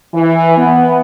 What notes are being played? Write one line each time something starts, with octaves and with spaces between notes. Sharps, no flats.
E3
B3